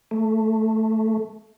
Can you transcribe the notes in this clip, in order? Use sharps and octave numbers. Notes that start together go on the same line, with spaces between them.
A3